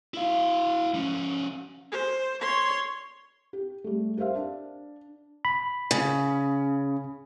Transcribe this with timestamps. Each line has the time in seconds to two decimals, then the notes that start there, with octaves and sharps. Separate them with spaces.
0.14 E4 F5
0.94 F3 C#4
1.92 C5
2.41 C#5 C6
3.53 G4
3.84 G3 A3
4.17 G4 A#4 C5 E5 F5
4.35 D4
5.45 B5
5.91 C#3